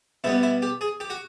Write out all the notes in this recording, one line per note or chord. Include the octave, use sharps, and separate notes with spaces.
B2 G3 B3 E4
E4
G4
G#4
G4
F#4